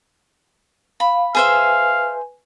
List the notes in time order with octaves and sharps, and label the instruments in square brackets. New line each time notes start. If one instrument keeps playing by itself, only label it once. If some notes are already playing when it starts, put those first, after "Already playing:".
[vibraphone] F5 [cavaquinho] B5
[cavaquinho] G#4 C5 E5 [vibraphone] B4 G#5 [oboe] F5